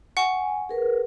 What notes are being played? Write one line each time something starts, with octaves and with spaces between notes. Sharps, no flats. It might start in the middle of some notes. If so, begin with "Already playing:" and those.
F#5 G#5 C#6
G#4 A#4 B4